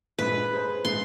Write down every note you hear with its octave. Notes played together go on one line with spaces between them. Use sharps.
A#1 A#2 G#3 B4
G#4 C5 B5
A#1 G#2 C6